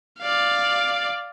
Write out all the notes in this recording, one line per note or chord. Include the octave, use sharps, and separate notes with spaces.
D5 F5